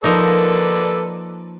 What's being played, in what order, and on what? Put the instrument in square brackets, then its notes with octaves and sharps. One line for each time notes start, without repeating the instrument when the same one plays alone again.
[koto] F3 A#3 D#4 [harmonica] A4 B4 D5